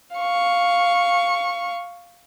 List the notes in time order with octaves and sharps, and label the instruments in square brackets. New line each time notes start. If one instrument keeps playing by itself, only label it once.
[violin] F5 C#6